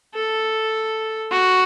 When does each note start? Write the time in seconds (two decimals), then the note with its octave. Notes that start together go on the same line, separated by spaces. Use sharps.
0.15 A4
1.31 F#4